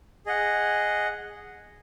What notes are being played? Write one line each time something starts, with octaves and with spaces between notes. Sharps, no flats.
G#4 D#5 F#5